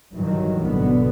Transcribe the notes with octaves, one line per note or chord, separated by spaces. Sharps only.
G2 D#3 E3 F#3
G#1 B2 D3 B3